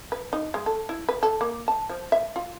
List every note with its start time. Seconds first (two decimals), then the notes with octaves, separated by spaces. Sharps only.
0.12 B4
0.33 D#4
0.54 G#3
0.66 A4
0.89 E4
1.09 B4
1.23 A4
1.41 A#3
1.68 A5
1.90 F3
2.12 E5
2.36 F4